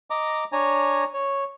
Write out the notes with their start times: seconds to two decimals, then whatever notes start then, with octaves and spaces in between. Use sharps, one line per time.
0.10 D#5 A#5 D6
0.52 D4 C#5 G#5 A#5
1.14 C#5